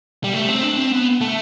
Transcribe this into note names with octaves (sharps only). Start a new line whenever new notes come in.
G3
A3
C4
D4
C4
B3
A3